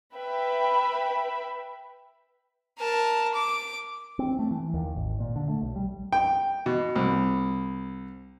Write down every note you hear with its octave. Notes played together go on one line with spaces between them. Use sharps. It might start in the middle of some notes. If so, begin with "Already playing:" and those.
B4 E5 G5 B5
A#4 A5
D6
C4
A3
E3
D#2
G#1
A#2
D3
A3
B1
G3
G5
B2
C2